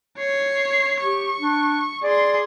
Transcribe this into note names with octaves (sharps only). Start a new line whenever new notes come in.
C#5 C7
G4 C#6
D4
G#4 D5 C6